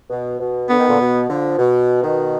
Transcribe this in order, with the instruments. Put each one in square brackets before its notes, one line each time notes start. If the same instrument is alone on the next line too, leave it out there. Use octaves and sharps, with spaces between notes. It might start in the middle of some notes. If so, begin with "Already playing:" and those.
[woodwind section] B2
B2
[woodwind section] D3 [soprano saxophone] B3
[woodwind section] D#3
A#2 D3
B2
D3 F3
B2
B2 D#3